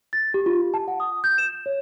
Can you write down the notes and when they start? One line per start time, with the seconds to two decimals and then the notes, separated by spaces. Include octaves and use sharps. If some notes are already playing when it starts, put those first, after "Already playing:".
0.13 A6
0.34 G4
0.46 F4
0.74 A5
0.88 F#5
1.00 D#6
1.24 G6
1.38 E7
1.66 C#5